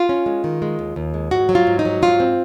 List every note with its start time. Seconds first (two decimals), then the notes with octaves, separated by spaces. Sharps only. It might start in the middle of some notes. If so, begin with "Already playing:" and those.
Already playing: F4
0.09 C#4
0.26 G#3
0.44 D#3
0.62 G#3
0.79 D#2
0.96 D#2
1.14 G#3
1.31 G#2 F#4
1.49 F#3
1.55 F4
1.67 G#2
1.79 D#4
1.85 F#3
2.02 G#2 F4
2.20 C4